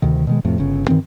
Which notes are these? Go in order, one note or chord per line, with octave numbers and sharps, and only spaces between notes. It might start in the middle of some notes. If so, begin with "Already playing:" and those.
D2 C3 D#3
B2 D#3 G#3
F2 A2 C3
G1 C#3
G2 D#3 E3 C4